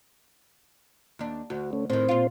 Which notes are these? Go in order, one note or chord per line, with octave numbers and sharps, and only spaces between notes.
D#2 D4
D2 F#4
A3 C#4
A2 D#3 C4 C5
A#2 F4